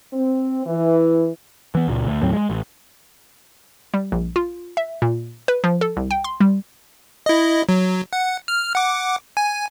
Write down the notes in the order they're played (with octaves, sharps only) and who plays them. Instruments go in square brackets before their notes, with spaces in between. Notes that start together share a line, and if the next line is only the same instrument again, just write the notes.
[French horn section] C4
E3
[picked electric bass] E3 B3
C#2 A#2
D2
D#2 A2 F#3 C4
G#3
A1
[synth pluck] G3
A#1
F4
E5
A#2
B4
F3
A4
C2
G5
C6
G3
[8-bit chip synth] E4 D#5
F#3
F#5
F6
F#5 D6
G#5